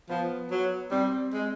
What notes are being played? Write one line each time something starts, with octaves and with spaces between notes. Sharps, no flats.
F3 B3
F#3
G3 C4
G#3